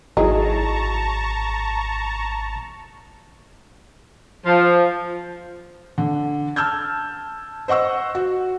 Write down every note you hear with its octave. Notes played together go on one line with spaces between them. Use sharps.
G#1 F#3 D#4 E4 G#4 A5 A#5 C#6
F3
D3
A5 E6 F6 G6 G#6
C5 D#5 F#5 C#6 E6
F#4